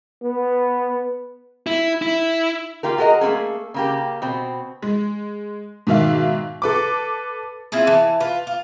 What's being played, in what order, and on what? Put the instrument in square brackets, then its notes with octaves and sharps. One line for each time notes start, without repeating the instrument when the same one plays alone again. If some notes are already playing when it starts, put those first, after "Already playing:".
[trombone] B3
[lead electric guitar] E4
E4
[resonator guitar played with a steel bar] A#3 F4 G4 A#4
F#4 G#4 A#4 C5 D#5
A3 A#3 C4 C#4 G#4
C#3 A#3 G4
B2 C4
[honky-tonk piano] G#3
G#2 B2 D#3 E5 F5
A4 B4 D6
[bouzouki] C4 E4 F4 G#4
E3 A5
F4 B4
F4